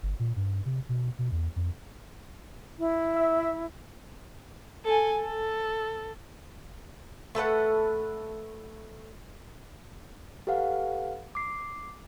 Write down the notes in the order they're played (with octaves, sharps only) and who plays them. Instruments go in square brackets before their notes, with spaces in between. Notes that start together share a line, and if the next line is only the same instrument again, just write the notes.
[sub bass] G1
A#2
G2
C3
B2
B2
E2
F2
[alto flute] E4
[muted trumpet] E5
[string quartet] A4 G#5
A4
[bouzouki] A3 A4 B4 F#5
[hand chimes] G4 A4 B4 F5 F#5
D6 C7